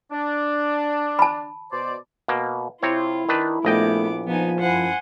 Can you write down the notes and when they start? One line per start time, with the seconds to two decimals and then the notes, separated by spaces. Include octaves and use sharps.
0.12 D4
1.19 A5 B5
1.72 B2 C5 D5
2.28 B2 A#3
2.83 C3 C4 E4 F4 C#5
3.29 D#3 D4 B4
3.65 A#1 A3 B3 D#5 G5 D6
4.27 F3 B3 D#4 G#5
4.60 F#2 E4 C5 F#5 G#5